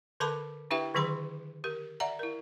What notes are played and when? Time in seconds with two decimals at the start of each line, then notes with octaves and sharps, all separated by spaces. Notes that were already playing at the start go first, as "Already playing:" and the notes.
0.20 D3 A4 A#4 A5 B5 D6
0.71 D4 E4 G4 B4 E5 G5
0.94 D3 D#3 F#3 G#4 B5 C6
1.64 G4 A#4
2.00 D5 E5 F#5 A#5
2.19 E4 A#4